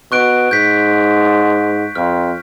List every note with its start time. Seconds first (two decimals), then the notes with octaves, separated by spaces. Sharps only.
0.12 B2 C#6 F#6 D7
0.51 G#2 G6 B6
1.95 F2 F6